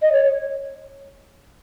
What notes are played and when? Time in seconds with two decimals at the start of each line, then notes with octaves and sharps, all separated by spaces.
0.02 D#5
0.13 C#5